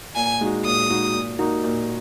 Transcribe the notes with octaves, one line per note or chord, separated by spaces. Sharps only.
A#2 G#5
G#3 D#4 F#4
A#2 D#6
G#3 D#4 F#4
A#2
A#3 D#4 F#4
A#2